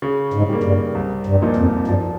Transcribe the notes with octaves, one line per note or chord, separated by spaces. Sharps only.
C#3
G#2
G3 A#3
G2
C2
G2
A#2 F3 A#3 D#4
F2
G2 F3